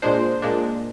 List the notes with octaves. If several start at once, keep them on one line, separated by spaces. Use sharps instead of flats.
A#2 G#3 D4 C5
A#2 G#3 D4